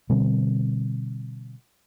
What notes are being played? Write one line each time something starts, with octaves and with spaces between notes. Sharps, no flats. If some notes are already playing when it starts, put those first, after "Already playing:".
B2 D3 G3 C4